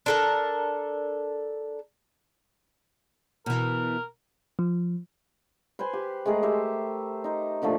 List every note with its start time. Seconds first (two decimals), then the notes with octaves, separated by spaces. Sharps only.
0.06 D4 A4 A#4
3.46 B2 E3 A#4
4.59 F3
5.79 B4 C5 G#5 C6
5.93 G4
6.25 G#3 A3 G#4 A#4
6.43 G4 C5 E5
7.24 D#4 C5
7.62 A#2 D3 F3 A3